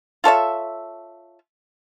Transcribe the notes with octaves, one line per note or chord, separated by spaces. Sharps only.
F4 A4 C#5 E5